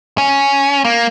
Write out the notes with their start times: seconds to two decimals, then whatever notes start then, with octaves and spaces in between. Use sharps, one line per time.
0.18 C#4
0.85 A#3